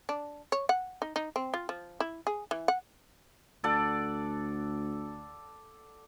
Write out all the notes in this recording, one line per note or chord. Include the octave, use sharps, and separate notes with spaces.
D4
C#5
F#5
D#4
D#4
C4
F4
F3
E4
G#4
E3
F#5
D2 A4 D5 F#5